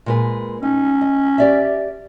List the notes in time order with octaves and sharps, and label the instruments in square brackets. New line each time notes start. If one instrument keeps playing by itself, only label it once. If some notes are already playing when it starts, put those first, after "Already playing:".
[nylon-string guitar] A#2 G#3 B4
[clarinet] C#4 [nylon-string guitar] D#4
[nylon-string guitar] D#5
G4 D5 E5